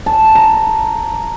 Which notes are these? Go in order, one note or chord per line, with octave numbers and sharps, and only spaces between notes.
A5
A#5